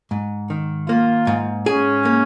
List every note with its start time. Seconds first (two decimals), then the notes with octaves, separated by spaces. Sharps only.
0.11 G#2
0.50 D#3
0.88 A#3 F4
1.27 G#2
1.66 C#4 G#4
2.05 A#3